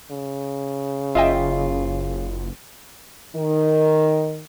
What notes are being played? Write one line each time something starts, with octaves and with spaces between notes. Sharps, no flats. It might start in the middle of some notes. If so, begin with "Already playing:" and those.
C#3
F#1 F4 D#5 E5 G5
D#3